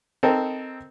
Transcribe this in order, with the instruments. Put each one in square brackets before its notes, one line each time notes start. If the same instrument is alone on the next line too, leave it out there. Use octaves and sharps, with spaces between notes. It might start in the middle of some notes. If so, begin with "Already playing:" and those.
[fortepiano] C4 D#4 A4 A#4